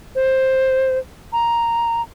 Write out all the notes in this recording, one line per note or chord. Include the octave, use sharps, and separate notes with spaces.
C5
A#5